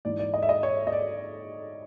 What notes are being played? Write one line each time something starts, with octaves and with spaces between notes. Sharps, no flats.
G#2 E3 D5
D5
D#5
E5
D#5
C#5
D#5
D5